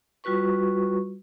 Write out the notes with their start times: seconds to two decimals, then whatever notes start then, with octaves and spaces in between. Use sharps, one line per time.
0.24 G3 F4 F#4 B4 C#6